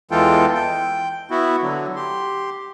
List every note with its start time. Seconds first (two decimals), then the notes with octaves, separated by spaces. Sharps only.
0.11 E2 E3 G#3 F4 A4 G5
0.54 G5
1.31 B3 E4 F#4
1.62 D3 F#3
1.96 G4 C6